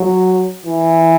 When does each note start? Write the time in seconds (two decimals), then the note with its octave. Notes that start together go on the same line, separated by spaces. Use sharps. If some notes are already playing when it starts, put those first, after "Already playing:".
Already playing: F#3
0.66 E3